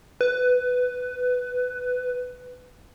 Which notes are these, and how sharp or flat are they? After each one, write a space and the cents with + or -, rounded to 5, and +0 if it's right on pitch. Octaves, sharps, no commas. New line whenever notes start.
B4 +15